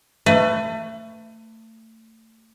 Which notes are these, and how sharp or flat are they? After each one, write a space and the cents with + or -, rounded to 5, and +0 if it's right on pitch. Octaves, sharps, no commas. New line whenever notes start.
A3 +30 B4 +30